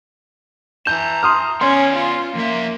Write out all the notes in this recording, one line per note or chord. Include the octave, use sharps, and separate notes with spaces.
E3 A5 A#5 G6
C6 D#6 F6
B3 C#4 D5 C6
F4
F2 A#3 E5